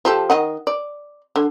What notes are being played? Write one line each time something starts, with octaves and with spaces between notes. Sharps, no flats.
F3 G4 A4
D#3 D#5 F#5
D5
D3